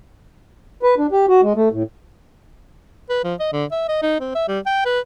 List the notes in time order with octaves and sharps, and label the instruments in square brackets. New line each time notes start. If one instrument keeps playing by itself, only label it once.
[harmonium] B4
D4
G4
F#4
G#3
A3
A2
[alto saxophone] B4
F3
D#5
D3
E5
D#5
D#4
C4
E5
G3
G5
B4